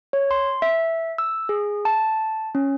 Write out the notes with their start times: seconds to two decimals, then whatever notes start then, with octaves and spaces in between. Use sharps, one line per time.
0.13 C#5
0.31 C6
0.62 E5
1.18 E6
1.49 G#4
1.85 A5
2.55 C#4